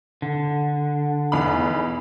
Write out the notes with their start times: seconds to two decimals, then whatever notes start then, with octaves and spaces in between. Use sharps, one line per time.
0.22 D3
1.32 B1 E2 B5